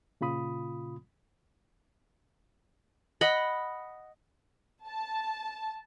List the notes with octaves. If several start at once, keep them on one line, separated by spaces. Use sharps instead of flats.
A#2 C#3 F4 B5 D#6
D#5 F#5 B5
A5